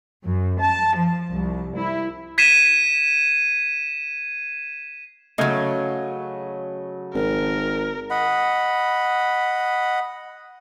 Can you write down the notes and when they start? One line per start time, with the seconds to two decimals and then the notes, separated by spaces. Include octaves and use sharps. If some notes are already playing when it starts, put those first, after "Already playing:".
0.24 F#2
0.59 A5
0.96 F3
1.32 C2
1.78 E4
2.38 G#6 B6 C7 D#7 E7
5.38 C#3 F#3 A3 D#5 G#6
7.14 G#1 A#4
8.10 D#5 F#5 B5